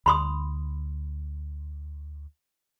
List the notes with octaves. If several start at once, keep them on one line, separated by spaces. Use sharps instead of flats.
D2 B5 C6 D#6